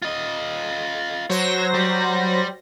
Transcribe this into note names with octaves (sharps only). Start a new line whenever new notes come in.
F4 D#5
F#3 C5 C#5 A#6
G3 G4